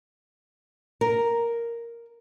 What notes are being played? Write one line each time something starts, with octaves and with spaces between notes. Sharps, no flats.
A#4